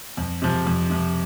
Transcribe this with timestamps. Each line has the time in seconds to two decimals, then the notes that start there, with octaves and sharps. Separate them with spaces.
0.17 F2
0.42 C3 F3
0.67 F2
0.90 C3 F3